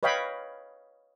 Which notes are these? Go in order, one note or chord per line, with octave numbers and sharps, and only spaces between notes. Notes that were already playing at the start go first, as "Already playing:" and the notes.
B4 C#5 D#5 F5 G5 B5